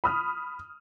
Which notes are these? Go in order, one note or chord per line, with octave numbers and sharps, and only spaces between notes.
B5 D#6 F6